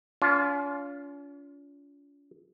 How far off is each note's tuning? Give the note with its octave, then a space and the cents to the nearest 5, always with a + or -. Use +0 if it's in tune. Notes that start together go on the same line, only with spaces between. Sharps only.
C#4 +45 F4 +0